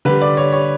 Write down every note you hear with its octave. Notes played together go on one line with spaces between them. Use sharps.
D3 G3 B4
D5
C#5
C#5